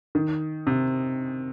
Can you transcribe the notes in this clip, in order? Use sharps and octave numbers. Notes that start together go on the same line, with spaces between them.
D#3
C3